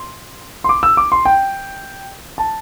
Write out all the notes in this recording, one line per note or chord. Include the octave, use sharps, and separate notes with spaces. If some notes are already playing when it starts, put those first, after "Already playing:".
Already playing: C6
C6
D6
E6
D6
C6
G5
A5